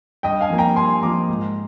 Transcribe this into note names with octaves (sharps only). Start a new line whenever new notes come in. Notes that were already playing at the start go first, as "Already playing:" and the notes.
G2 D#5 G5
F5 G#5
F3 A#3
G5 A#5
G2 G#5 C6
F3 A#3 A#5 D6
G#2